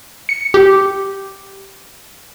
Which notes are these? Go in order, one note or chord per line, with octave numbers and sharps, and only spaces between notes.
C#7
G4